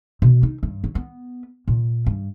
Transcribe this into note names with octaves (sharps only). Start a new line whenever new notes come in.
B2
D#4
G2
F#3
B3
A#2
G2